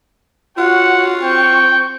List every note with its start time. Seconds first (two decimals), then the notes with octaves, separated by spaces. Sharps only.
0.58 F4 F#4 C#5 F#5
1.21 C4 G5 C#6